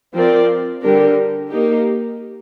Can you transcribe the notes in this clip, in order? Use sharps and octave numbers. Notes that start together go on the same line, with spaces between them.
F3 C4 F4 A#4 D5
D3 G3 D4 G4 A#4
A#3 D#4 G4